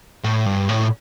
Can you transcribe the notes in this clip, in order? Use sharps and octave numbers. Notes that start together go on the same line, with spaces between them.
A2
G2
A2